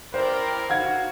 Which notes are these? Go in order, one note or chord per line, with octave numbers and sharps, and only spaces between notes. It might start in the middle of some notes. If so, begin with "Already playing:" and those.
E4 G4 A#4 C5 D5
F#4 F5 F#5 G#6